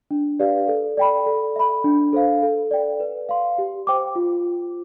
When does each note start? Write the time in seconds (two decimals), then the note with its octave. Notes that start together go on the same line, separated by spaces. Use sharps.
0.11 D4
0.40 G4 B4 D5 F5
0.68 A4
0.97 D5 G5 B5
1.26 A4
1.56 E5 B5
1.84 D4
2.13 A4 C5 F5
2.43 A4
2.71 D5 G5
3.00 B4
3.29 F5 C6
3.58 G4
3.87 C5 G5 D6
4.16 F4